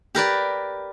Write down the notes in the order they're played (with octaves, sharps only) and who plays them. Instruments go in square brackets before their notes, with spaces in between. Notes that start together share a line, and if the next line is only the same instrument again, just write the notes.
[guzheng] G4 A#4 B4 D5